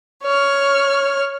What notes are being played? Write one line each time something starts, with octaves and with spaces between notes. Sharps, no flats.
C#5 F6